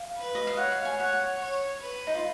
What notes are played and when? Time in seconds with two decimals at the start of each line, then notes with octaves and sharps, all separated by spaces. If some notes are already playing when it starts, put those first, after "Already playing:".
Already playing: F5
0.17 B4
0.35 D#5
0.47 F5
0.57 C#5 F#5
0.72 F5
0.85 G#5
1.00 F#5
1.13 F#5
1.40 C#5
1.81 B4
2.07 D#4
2.15 F4